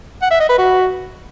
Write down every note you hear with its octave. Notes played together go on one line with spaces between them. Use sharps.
F#5
E5
D#5
B4
F#4